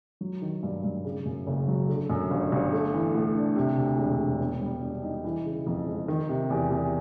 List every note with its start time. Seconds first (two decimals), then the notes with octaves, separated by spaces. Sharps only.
0.21 F#3
0.42 D#3
0.63 G2
0.84 G2
1.04 C#3
1.26 F#2
1.47 F#1
1.68 F#3
1.89 D3
2.10 F#2
2.30 G1
2.52 G1
2.73 A3
2.94 E3
3.15 A2
3.35 D4
3.56 C3
3.78 D2
3.98 E1
4.19 E1
4.41 B3
4.62 G3
4.82 B2
5.03 D#4
5.24 E3
5.45 C#3
5.67 F2
5.87 G#3
6.08 D#3
6.29 C3
6.50 E2
6.71 E2